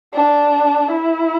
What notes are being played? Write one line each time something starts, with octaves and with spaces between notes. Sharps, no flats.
D4
E4